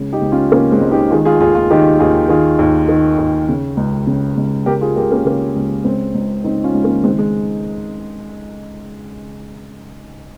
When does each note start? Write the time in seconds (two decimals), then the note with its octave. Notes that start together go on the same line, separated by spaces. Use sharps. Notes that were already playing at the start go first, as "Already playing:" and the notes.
Already playing: C#2 C#3
0.13 D#4 G4
0.22 C#2
0.31 C#4 F4
0.52 C#3 A#3 C#4
0.71 G#3 C4
0.81 C#2
0.91 D#4 G4
1.11 D#3 F4 G#4
1.25 F4 G#4
1.40 D#2 F4 G#4
1.55 F4 G#4
1.70 D#3 D#4 G4
2.00 D#2 F4 G#4
2.29 D#3 F4 G#4
2.59 D#2
2.88 D#3
3.18 D#2
3.49 C#3
3.77 C#2
4.07 C#3
4.37 C#2
4.66 C#3 G4 A#4
4.81 F4 G#4
4.96 C#2 G4 A#4
5.10 A#3 C#4
5.25 C#3 A#3
5.56 C#2
5.84 C#3 G#3 C4
6.15 C#2
6.44 C#3 C4 D#4
6.64 C#4 F4
6.74 C#2
6.84 A#3 C#4
7.04 D#3 G#3 C4
7.19 G#3